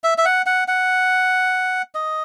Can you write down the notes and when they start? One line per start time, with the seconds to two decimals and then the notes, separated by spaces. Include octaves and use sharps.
0.04 E5
0.18 E5
0.25 F#5
0.46 F#5
0.68 F#5
1.95 D#5